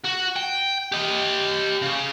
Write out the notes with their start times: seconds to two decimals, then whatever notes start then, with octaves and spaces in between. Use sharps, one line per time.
0.05 F#4
0.36 G5
0.92 G4 D#5
1.82 C#3